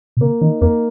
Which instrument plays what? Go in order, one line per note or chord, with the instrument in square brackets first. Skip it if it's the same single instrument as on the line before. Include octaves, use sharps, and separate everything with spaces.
[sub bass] B2
[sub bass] C#3 [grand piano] A#3
[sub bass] D#3 [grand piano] D#4
[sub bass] E2 [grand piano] A#3